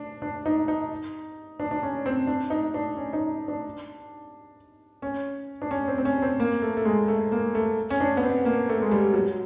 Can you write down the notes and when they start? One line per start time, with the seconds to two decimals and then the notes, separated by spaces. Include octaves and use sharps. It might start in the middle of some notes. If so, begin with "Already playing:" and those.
Already playing: D4
0.22 D4
0.46 D#4
0.68 D#4
1.60 D4
1.71 D4
1.83 C#4
2.06 C4
2.27 D4
2.50 D#4
2.74 D4
2.97 C#4
3.13 D#4
3.48 D4
5.02 C#4
5.62 D4
5.71 C#4
5.88 C4
5.98 C4
6.05 C#4
6.22 C4
6.40 A#3
6.62 A3
6.77 A3
6.85 G#3
7.08 A3
7.32 A#3
7.55 A3
7.90 C#4
8.00 D4
8.17 B3
8.23 C4
8.45 A#3
8.69 A3
8.82 G#3
8.91 G3
9.14 F#3